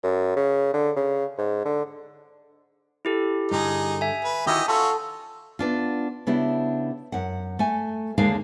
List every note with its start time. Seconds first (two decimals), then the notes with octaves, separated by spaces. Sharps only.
0.03 F#2
0.36 C#3
0.73 D3
0.96 C#3
1.38 G#2
1.65 D3
3.05 E4 G4 A4
3.51 G2 D3 D#4 G#4
4.01 E5 G#5
4.25 B4
4.47 D#3 E4 F#4 G4 D#5
4.68 C#4 F4 F#4 A4
5.59 B3 D4 F4
6.27 C#3 B3 D4 E4 G4
7.12 F#2 F#5
7.59 A3 G#5
8.18 D#2 D3 G#3 A#3 D4 F5